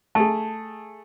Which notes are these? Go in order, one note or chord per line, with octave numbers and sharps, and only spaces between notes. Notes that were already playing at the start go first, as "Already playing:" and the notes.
A3 G#4 A5